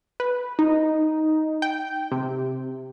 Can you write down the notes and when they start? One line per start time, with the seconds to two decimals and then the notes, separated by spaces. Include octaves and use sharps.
0.20 B4
0.59 D#4
1.62 G5
2.11 C3